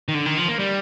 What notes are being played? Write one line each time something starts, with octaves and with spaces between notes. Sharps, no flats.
D#3
D3
D#3
F3
A#3
G3